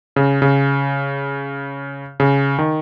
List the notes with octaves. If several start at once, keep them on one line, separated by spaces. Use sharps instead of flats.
C#3
C#3
C#3
D#3